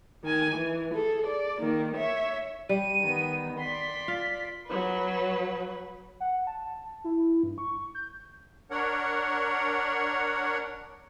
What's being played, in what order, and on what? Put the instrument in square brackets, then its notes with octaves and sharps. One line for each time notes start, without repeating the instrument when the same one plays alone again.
[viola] D#3 G#5
E3
G#4 A4
D5
D#3 A#3
C#5 E5
[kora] G3 [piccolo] D#7
[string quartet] D#3 B3
[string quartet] D5 C6 [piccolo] B6
[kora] F4
[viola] F#3 B4
[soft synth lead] F#5
A5
E4
G2
C#6
G6
[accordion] D4 A#4 C#5 F#5